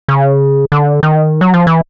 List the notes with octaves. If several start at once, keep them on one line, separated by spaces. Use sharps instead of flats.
C#3
D3
D#3
F#3
F3
E3